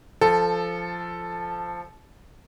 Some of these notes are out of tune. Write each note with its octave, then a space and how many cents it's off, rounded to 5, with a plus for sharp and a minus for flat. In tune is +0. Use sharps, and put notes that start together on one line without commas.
F3 -10 A4 +0